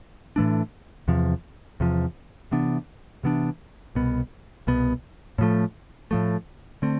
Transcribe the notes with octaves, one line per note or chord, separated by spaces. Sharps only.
A2 E3 A3 D4
E2 C3 F3
E2 C3 F3
C3 E3 B3 D4
C3 E3 B3 D4
C2 B2 B3
C2 B2 B3
A2 F3 A3
A2 F3 A3
D3 A3 C4